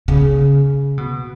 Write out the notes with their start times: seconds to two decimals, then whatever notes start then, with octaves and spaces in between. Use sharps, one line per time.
0.08 C#3
0.98 B2